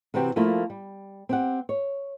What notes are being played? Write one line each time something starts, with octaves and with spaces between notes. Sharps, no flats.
C3 E3 C4 F#4 G4
F3 A3 A#3 E4 F4
G3
C4 G4 F#5
C#5